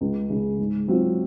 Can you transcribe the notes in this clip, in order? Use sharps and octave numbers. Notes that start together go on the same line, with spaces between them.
C#2
C#3 G#3
G#2
F#3 C4 F4